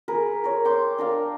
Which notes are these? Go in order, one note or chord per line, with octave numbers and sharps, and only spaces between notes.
G#4 A#4 B4
A#4 C#5
G5 C6 D6
D4 A#4 F5